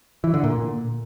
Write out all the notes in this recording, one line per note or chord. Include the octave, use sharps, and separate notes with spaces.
E3
D3
A#2